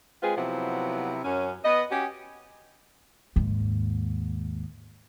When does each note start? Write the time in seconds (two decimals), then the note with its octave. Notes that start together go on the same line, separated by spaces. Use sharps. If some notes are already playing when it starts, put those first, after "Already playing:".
0.23 G#3 C4 F4 G#4 B4
0.37 C3 F3 F#3 B3 E4
1.24 F#2 C#4
1.65 B3 B4 D#5
1.91 C#4 F#4 G4
3.36 D#2 G#2